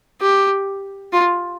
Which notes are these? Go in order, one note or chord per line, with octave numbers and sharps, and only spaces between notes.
G4
F4